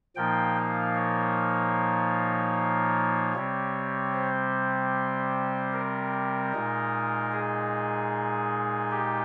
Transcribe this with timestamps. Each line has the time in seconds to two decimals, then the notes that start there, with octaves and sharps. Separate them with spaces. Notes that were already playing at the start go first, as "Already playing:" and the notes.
0.16 A#2 F3 A#3 D#4 G5
0.56 F5
0.95 C#5
3.34 C3 G3 C4
4.13 C5
5.73 A#4
6.52 A#2 G#3 D#4
7.32 G#4
8.91 G4